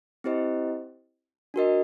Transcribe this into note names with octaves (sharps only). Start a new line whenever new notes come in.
C4 E4 G4 C5 D#5
D4 F#4 A#4 D#5